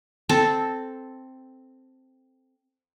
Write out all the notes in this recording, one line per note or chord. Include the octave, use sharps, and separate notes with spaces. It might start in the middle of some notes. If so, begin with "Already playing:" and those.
C4 A4 A5